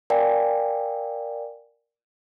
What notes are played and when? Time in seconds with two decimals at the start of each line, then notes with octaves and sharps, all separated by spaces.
0.10 A#4 D5 F5 G5 G#5